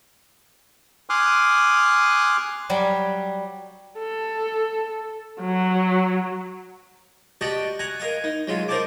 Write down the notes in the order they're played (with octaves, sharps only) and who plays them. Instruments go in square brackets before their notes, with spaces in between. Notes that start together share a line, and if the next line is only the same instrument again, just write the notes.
[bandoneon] G#5 C6 D6 D#6 F6 F#6
[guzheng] F#3 G3
[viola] A4
F#3
[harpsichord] F#4 G4 D5 D#5 G5 A5
F#5 G#5 A#5
A#4 D#5 F5 G#5
D#4
F#3 G#3 F4
D#4 A#4 C5 D5 A5 D6